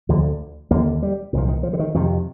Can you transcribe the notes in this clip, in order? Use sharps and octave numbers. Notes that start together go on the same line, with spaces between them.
D2 D3 F3
D#2 D3 A#3
G3
C2 A#2 F3
D#3
F3
D3
D#3
F2 C3 D#3